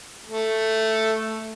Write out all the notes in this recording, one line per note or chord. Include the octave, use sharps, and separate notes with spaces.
A3